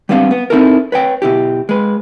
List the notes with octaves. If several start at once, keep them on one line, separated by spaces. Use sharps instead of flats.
G3 B3 C4 D4 F5
B3
C4 D#4 E4 A4 A#4
B4 C#5 G5
B2 E4 G4
G#3 B4